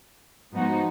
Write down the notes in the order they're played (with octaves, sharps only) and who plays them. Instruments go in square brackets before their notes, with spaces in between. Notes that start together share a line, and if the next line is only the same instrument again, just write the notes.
[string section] G#2 F3 B3 D#4 F#4